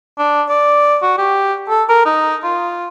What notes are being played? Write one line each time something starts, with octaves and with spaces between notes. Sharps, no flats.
D4
D5
F#4
G4
A4
A#4
D#4
F4